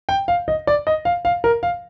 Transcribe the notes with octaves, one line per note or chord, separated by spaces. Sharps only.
G5
F5
D#5
D5
D#5
F5
F5
A#4
F5